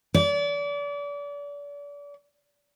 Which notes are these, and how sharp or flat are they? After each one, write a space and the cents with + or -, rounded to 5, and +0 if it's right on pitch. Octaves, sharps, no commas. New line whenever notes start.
D5 -35